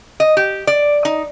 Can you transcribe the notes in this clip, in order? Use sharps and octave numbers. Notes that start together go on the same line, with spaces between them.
D#5
G4
D5
D#4